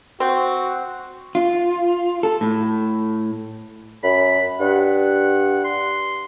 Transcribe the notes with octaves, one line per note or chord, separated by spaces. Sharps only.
C4 F#4
F4
A4
A2
F#2 B5
G2 F#5
C6